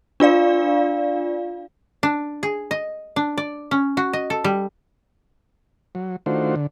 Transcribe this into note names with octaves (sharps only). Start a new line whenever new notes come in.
D4 F4 D5 F5
D4
G#4
D#5
D4
D5
C#4
F#4
D#5
A4
G3
F#3
D#3 A3 D4 F4 F#4 C5
D3